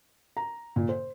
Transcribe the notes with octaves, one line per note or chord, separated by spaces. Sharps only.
A#5
A#2
C5